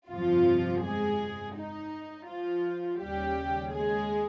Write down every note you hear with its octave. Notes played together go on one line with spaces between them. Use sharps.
G1 F2 C3 F3 F4
G#3 G#4
D#4
F3 F4
D#2 C#3 G3 G4
G#3 G#4